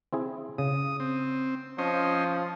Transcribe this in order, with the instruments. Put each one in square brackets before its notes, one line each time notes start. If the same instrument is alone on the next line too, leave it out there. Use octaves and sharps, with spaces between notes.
[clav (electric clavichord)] C4 E4 G#4
[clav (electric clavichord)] C#3 [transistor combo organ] D#6
[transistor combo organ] C4
[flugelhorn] F3 [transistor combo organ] C#4 C5 D#5